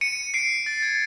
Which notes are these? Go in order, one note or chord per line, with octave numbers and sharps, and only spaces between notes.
C#7 D#7
C7 D7
A6
G#6